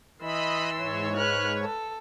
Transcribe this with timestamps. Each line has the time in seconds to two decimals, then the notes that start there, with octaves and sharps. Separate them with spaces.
0.22 E3 D#5 B5 C6 E6
0.78 G#2 C#5
1.15 B4 F6 F#6
1.63 A4